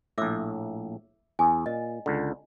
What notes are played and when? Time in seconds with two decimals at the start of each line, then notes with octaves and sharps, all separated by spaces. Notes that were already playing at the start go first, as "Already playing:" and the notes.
0.18 A#1 A2 E5 D6 E6
1.39 E2 G#5
1.66 A#2 D#5
2.06 C#2 D3